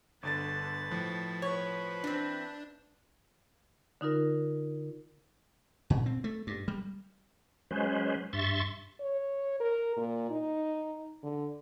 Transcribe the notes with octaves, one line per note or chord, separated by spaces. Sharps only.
G1 D3 B4 A5 A6
A2 F3
B4 C#5
E3 C4 D4
D3 D#4 F4 A#4
A#2
C4
A3
G2
G3
F#3 G#3 C#4 B4 C5
G2 E5 C6 C#6 A6
C#5
A#4
A#2
D#4
D3